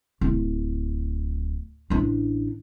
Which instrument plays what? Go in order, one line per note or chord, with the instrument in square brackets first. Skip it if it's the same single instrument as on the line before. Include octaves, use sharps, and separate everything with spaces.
[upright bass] D1
A1 D4